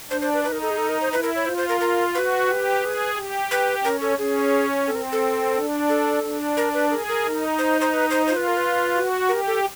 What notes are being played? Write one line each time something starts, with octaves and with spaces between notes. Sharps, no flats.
D4 C5
C5
B4
D#4 B4
A#4
A4
G#4
A4
A#4
C5
E4 B4
A#4
C#5
F4 C5
C5
A#4
A#4
F#4 B4
G4
G#4
G4
B4
C#4 A#4
A4
C#4 G#4
C4 A4
A#4
A4
D4
A4
D4
A#4
B4
G#4 A#4
A#4
D#4
C5
C5
B4
C5
F4 C5
B4
A#4
B4
F#4
G4 A#4
A4